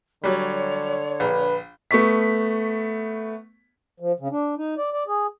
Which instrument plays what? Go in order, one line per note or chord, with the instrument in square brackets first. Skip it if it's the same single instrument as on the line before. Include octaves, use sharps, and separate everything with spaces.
[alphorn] D3 [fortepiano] F#3 G3 [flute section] C#5
[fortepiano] A#1 [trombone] B4
[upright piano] A3 B3 C#6 B6
[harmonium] F3
C#3
D4
D#4
D5
D5
G#4